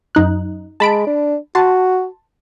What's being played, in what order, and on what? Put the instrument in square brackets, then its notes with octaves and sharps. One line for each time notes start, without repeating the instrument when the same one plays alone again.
[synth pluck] F#2 D#4 F#6
[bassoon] G#3 [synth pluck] A5 B5 D7
[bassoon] D4
[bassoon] F#4 [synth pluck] A5 C6